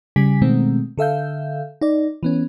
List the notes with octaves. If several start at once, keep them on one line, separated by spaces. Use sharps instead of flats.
C#3 G3 G#5 B6
B2 D#3 G#3 A3 C4
D3 A4 E5 F5 G6
D#4 D5
E3 B3 C#4